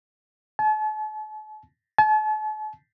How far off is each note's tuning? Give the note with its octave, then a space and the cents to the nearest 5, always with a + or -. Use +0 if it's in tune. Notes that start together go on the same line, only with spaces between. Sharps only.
A5 -40
A5 -40